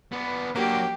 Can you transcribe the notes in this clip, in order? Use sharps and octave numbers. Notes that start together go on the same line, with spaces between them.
B3 D4 B4
F#3 A#3 D4 F#4 G4